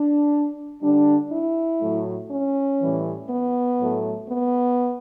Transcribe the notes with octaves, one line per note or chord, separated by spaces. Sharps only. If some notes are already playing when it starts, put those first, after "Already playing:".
Already playing: D4
D3 G3 D4
E4
A2 F#3 A3
C#4
A2 E3 G3
B3
A2 F#3 A3
B3